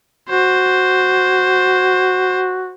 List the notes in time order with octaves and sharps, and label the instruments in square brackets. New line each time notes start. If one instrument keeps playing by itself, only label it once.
[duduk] F#4 [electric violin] C5